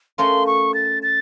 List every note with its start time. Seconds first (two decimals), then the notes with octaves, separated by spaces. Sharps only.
0.18 A3 C#4 F4 A#4 C#5 C6
0.47 C#6
0.74 A6
1.03 A6